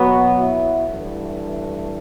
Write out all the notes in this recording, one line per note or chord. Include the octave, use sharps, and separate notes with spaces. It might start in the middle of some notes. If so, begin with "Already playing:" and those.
Already playing: B2 F#3 B3 F#4
E4
G2 E3 A3